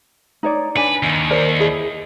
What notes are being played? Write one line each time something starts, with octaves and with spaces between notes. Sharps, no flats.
D#4 C#5 D5
D4 B4 G#5
D#2
A#4 C5 D5
E4 G#4 D#5